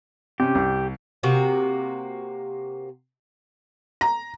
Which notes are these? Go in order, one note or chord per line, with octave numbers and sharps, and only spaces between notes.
C3 C#4 G4
C2
C3 A#3 F#4
A#5